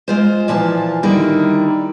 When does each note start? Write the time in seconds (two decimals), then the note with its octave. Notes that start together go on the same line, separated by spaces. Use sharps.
0.08 G#3 F4 C5
0.48 A#2 E3 F3 A#3 A5
1.03 D3 D#3 G3 A#3 D#4 E4